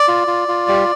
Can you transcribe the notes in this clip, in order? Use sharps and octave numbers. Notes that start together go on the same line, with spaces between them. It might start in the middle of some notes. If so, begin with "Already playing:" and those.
Already playing: D5
F4
F4
F4
G3